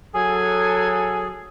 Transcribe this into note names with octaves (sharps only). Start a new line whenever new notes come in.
F#3 G#4 A4 G#5